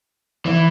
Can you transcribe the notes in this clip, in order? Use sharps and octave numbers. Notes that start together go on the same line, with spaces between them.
E3